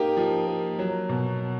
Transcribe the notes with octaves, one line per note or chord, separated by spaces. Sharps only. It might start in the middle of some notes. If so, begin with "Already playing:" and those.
Already playing: A#3 D#4 G4
F3
A#3
F#3
B2